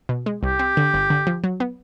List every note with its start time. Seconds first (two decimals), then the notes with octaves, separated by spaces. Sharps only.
0.09 B2
0.26 G#3
0.43 C2 G4
0.59 C4
0.77 D3
0.94 G1
1.10 D3
1.27 F3
1.44 F#3
1.60 B3